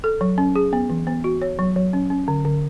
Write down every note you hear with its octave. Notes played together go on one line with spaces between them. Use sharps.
A4
F#3
C#4
G#4
B3
E3
B3
F#4
C#5
F#3
F#3
C#4
C#4
D3
D3